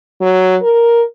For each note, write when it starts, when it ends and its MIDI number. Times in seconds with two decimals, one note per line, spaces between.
0.21 0.57 54
0.62 1.02 70